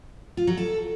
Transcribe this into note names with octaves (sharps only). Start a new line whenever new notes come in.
F4
F#3
A4